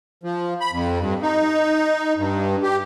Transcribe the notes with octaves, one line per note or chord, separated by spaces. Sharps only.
F3
B5
F2
G2
D#4
G2
G4